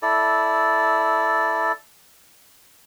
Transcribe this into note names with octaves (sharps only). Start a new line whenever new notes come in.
E4 A4 D5